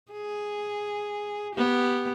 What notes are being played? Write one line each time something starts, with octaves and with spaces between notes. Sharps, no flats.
G#4
B3 G4